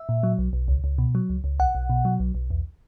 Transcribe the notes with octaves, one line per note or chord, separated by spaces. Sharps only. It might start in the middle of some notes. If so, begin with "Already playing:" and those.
Already playing: E5
A#2
F#3
B1
B1
C#2
C#2
B2
F#3
C#2
C#2
B1 F#5
B1
B2
F#3
B1
B1
E2